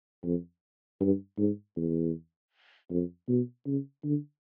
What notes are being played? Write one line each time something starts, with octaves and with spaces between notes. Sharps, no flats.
F2
G2
G#2
E2
F2
B2
C#3
D3